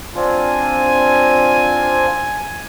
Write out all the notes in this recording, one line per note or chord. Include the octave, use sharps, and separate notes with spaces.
C4 D4 F4 G#5